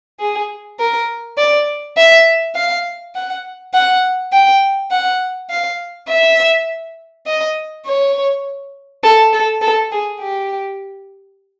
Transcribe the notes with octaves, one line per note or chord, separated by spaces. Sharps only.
G#4
A#4
D5
E5
F5
F#5
F#5
G5
F#5
F5
E5
D#5
C#5
A4
A4
A4
G#4
G4